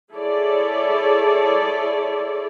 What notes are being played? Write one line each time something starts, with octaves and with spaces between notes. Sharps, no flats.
E4 G#4 A4 C#5 D5